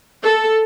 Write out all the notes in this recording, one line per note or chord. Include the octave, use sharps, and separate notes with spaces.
A4